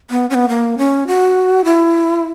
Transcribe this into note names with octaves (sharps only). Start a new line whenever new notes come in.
B3
C#4
B3
A#3
C#4
F#4
E4